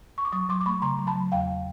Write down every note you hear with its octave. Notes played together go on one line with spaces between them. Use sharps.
C#6
D6
F#3 C#6 D#6
F#3 C6 D6
D6
A3 B5 C#6
C#3 A#5 C6
F#3
A5 B5
F#3
E2 F5 G5